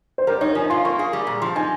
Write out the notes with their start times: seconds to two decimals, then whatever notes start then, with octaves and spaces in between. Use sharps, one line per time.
0.18 C5
0.27 G3 A#4
0.41 D#4 C#5
0.55 F3 G#5
0.70 F4 C6
0.85 A#3 C#6
0.99 G#4
1.13 G3
1.27 A#2
1.41 F3 C6
1.56 D#4 G#5